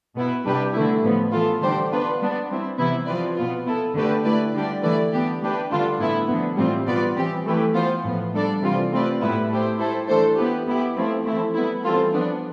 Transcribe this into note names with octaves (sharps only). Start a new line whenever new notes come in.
B2 B3 E4 B4
C3 G3 D4 G4 B4
D3 A3 E4
A2 F3 B3
E3 B3 F4 A4
D3 G3 D4 G4 C5
B3 D4 F4 B4
G3 B3 D4
G3 C4 E4
C3 E3 B3 E4
F3 C4 F4 B4 D5
B2 B3 F4
B3 E4 A4
D3 A3 D4 G4 B4
A3 E4 B4 D5
D3 G3 D4 G4 D5
E3 A3 E4 B4 D5
B3 D4 G4
A3 D4 G4 B4
D3 G3 D4 F4 A4
A2 E3 B3 E4
D3 F3 B3
A2 E3 G3 C4 F4
B2 B3 F4 B4 D5
E3 G3 C4 G4
E3 A3 E4 G4 B4
E3 B3 F4 C5
A2 F3 B3
G3 D4 A4 D5
C3 E3 G3 C4 F4
A3 C4 F4 B4 D5
A2 G3 B3 E4 B4
A3 E4 G4 C5
A3 E4 A4 C5
E3 A3 D4 A4 C5
B3 E4 G4 B4
B3 E4 G4
F3 A3 C4 E4
E3 A3 C4 E4 A4
G3 B3 E4
E3 G3 C4 F4 A4
F3 B3 D4